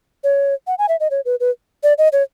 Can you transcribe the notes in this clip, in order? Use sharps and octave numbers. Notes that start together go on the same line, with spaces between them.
C#5
F#5
G#5
E5
D#5
C#5
B4
B4
D5
D#5
C#5